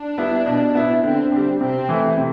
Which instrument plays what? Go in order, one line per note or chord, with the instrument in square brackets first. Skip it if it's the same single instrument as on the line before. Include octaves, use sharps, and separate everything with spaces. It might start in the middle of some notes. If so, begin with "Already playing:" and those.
Already playing: [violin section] D4
[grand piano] G3 B3 E4
B2
B3 E4
[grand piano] D3 [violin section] C4
[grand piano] G3 D4 [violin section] C4
[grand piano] C3 [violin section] C4
[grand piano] E3 A3 E4
C3